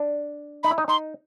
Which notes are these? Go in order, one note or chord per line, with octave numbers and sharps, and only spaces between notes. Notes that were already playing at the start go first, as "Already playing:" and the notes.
Already playing: D4
D#4 B5
E4
D#4
D#4 C6